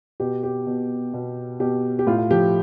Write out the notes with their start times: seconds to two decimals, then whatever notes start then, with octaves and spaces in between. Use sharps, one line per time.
0.20 B2 G4
0.43 G4
0.66 B2
1.13 B2
1.60 B2 G4
1.99 G4
2.07 A2 F4
2.18 F4
2.31 F3 G4